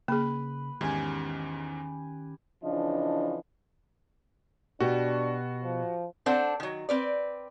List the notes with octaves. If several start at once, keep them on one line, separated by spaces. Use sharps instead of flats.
C#3 A#3 G#4 B4
E2 G#2 D#3 C#4 G4 G#5
C#3 E3 F3 D4 D#5
B2 D4 F#4 G4
F3
C4 D4 A4 C5 F#5
D#3 F#3
C4 B4 D5